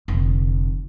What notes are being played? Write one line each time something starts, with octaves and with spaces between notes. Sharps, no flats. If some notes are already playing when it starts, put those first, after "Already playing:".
F1 D3